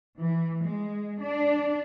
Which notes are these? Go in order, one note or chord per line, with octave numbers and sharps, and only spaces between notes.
E3
G#3
D4